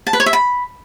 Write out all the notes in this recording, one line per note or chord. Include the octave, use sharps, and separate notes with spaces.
A5
B4
C#5
E5
B5